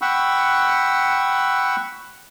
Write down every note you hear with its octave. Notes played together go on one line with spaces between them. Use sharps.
F#5 G5 B5 C#6 E6